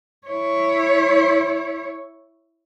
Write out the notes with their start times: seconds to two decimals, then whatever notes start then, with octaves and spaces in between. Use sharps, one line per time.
0.28 E4 C#5